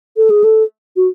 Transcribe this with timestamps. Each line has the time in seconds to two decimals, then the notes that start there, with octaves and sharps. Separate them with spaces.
0.17 A4
0.30 G#4
0.44 A4
0.96 F#4